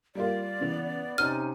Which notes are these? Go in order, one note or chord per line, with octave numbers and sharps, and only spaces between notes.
G3 A#3 F4 D5
C#3 E3 B3
C3 C#4 D#4 F6 D#7